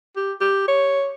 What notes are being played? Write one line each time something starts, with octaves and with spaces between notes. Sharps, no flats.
G4
G4
C#5